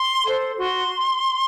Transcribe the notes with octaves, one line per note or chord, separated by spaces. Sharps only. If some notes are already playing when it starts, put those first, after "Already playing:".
Already playing: C6
A4 C5
F#4 C6